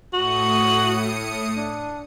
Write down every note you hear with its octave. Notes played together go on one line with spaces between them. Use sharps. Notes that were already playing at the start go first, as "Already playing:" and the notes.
A2 F#4 D#6 C#7
D4